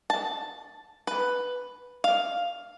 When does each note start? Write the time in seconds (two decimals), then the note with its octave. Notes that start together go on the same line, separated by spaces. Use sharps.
0.10 A5
1.07 B4
2.04 F5